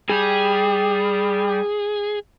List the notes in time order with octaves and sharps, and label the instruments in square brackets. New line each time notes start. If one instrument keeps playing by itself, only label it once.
[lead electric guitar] G3 [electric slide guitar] G#4